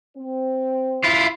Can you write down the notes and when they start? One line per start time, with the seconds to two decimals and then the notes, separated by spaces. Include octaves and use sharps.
0.16 C4
1.04 E4 F4